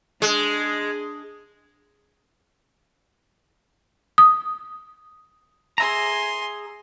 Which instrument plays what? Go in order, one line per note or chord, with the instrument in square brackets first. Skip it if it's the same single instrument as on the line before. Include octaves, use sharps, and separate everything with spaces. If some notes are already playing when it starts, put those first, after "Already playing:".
[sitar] G#3 [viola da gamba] D4 G#4
[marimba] D#6
[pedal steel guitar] G#4 E5 A#5 [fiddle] G#5 C6